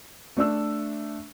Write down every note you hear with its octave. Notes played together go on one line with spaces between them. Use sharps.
A3 D4 E6